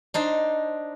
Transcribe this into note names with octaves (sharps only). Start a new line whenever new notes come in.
D4 D#4 C5